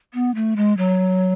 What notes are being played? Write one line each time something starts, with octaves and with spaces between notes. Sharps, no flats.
B3
A3
G#3
F#3